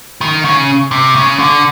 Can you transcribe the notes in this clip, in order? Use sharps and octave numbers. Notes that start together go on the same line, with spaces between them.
D#3
C#3
C3
C#3
D3